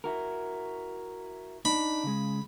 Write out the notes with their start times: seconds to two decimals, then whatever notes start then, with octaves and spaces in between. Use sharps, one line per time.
0.04 E4 F#4 A#4
1.65 D4 D#4 B5
2.04 C#3 G#3